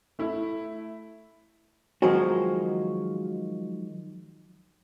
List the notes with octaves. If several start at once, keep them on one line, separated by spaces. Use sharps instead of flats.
A3 E4
D#3 F3 F#3 G#3 A#3 F#4